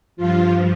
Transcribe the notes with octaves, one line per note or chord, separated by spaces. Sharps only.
G2 F3 F4